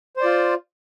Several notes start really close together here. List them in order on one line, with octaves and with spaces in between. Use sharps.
C5 D5 F4